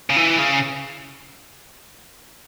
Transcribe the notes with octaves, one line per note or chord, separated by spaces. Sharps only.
C#3
E3
C#3